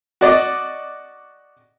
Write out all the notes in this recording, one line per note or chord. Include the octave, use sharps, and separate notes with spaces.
F#4 D5 D#5